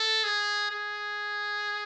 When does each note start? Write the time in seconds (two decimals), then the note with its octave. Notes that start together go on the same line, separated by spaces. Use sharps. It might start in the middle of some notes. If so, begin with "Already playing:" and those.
Already playing: A4
0.24 G#4
0.71 G#4